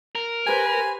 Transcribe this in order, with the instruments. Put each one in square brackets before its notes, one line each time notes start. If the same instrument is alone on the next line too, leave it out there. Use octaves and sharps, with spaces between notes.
[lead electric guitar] A#4
[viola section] G4 B4 C5 [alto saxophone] G#5